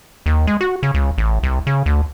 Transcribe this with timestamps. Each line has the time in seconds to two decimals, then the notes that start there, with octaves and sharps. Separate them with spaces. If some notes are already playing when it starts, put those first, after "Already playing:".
0.26 D#2
0.47 G#3
0.61 F#4
0.83 C#3
0.94 C#2
1.18 A1
1.43 C2
1.67 C#3
1.86 D2